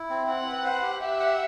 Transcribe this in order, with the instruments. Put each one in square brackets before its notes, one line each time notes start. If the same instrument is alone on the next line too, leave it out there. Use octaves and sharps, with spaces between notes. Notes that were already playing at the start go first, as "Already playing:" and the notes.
Already playing: [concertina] E4
C4
[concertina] C4 [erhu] F#5
[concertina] B4
C5
G4
[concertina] G4 [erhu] E5
[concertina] F#5